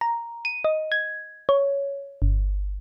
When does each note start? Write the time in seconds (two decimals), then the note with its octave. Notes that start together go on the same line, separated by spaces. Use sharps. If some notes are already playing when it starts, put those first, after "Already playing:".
0.01 A#5
0.45 D#7
0.64 D#5
0.92 G#6
1.49 C#5
2.22 G1